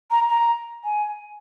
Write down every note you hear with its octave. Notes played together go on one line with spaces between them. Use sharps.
A#5
A#5
G#5